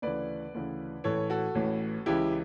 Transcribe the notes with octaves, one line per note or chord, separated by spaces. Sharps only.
D2 C#3 E3 B4 D5
D2 C#3 E3
A1 A2 E3 A4 C#5
F#4 A4
A1 A2 E3
C#2 C#3 E3 E4 G4